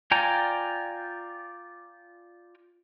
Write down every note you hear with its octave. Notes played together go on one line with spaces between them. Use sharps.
F4 D5 G5 G#5 A#5